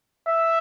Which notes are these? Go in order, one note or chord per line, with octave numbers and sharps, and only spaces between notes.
E5